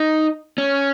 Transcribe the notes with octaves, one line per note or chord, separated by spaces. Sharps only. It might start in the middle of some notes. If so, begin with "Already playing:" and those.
Already playing: D#4
C#4